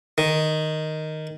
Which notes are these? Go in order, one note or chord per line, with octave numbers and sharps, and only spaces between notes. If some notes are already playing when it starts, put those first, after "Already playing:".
D#3